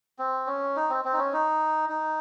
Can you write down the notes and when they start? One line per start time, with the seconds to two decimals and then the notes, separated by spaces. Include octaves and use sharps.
0.19 C4
0.47 C#4
0.76 D#4
0.90 C4
1.05 C4
1.13 D#4
1.18 C#4
1.33 D#4
1.89 D#4